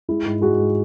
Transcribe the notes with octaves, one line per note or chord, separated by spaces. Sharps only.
G#3 E4
G#2
G#3 F#4
G#2